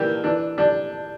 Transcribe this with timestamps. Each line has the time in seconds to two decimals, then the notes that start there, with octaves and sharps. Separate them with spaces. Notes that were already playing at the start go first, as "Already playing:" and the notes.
Already playing: E3 G3 A#3 G4
0.24 E3 D4
0.58 G3 D4